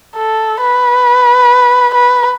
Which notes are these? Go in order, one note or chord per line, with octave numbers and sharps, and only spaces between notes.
A4
B4
B4